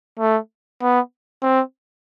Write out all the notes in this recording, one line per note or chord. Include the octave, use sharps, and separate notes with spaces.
A3
B3
C4